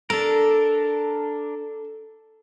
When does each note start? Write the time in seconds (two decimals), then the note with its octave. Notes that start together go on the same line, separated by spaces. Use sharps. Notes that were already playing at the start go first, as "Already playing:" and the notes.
0.10 D4 A4 A#4